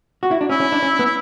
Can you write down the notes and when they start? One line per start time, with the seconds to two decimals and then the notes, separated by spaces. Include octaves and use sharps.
0.23 F#4
0.31 E4
0.41 D4
0.49 C#4 E4
0.60 C#4
0.72 D4
0.82 C#4
0.99 B3
1.05 E4